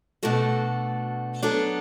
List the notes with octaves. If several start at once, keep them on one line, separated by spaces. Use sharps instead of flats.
B2 A3 D4 F#4 A4
F#3 B3 D4 A4